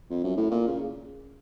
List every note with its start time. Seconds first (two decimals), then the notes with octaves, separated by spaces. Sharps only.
0.10 F2
0.24 F#2
0.37 A2
0.50 A#2
0.67 C#3